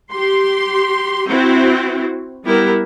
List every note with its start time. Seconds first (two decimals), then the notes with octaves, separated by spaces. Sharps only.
0.12 G4 C6
1.28 C4 E4 F#4
2.44 G3 B3 E4 G4 A#4